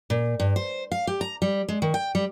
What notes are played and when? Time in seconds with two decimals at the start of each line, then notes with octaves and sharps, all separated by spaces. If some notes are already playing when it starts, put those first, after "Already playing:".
0.10 A#2
0.40 G2
0.56 C5
0.92 F5
1.07 G4
1.21 A#5
1.42 G3
1.68 G#3
1.82 D#3
1.94 G5
2.15 G3